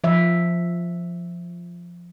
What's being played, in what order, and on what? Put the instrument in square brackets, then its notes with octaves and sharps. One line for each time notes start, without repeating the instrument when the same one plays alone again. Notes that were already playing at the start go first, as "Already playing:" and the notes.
[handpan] F3 E5